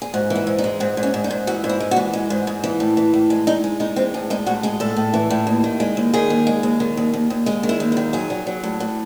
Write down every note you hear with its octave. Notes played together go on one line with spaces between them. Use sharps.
G#4
G#2 F#4
E3
E4
G#2
D#4
G#3
G#2 C4
G#2
C#4
G#2
D#4
G#2
E3 F#4
G#2
E4
G#3
F#4
E3
G#3
G#2
G#2
E3
A2
E3
A2
G#3
G#3 D#4
G#3
G#3 D#4
E3 C4
A2 G#4
G#3 D#4
A2 F#4
G#3 G#4
A2 A4
A2
E3
A2
D#2
D#3
G#3
D#2
D#3 G#4
D#2
G#3
D#2
D#3
D#2
D#2
D#2
G#3 G#4
D#3
E4
D#2
E4
D#3
F#3 G#4
F#3
F#3
A2
A2